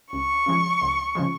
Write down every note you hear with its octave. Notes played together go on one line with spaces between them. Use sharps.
C#2 C#6
C#3 F3 G#3
C#2
C#3 F3 G#3